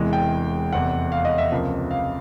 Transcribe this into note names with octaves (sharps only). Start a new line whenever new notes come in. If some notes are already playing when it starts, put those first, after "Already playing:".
Already playing: E1 E2 C3 E3 G#3
G5
F1 E2 C3 F#5
F5
D#5
E5
C#2 C3 F3 A#3
F5